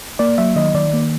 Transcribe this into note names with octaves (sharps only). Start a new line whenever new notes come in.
A#3 D5
F#3 E5
D#3 D#5
D#3 D5
A#3